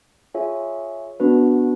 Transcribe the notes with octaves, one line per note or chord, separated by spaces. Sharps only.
F4 G#4 C#5 E5 G#5
B3 D4 F#4 B4